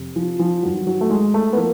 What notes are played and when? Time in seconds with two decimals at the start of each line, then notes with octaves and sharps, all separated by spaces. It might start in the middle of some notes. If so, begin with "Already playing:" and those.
Already playing: F2 C3
0.16 F3
0.39 F3
0.63 G2 D#3 F#3
0.87 F#3
1.01 A3
1.10 G#3
1.34 A3
1.53 B3
1.57 F3 A#3